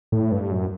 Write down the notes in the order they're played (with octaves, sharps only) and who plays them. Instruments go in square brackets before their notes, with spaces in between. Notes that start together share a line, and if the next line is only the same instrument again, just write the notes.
[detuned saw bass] A2
G2
F#2